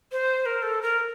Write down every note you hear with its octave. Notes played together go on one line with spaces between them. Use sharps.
C5
C5
A#4
A4
A#4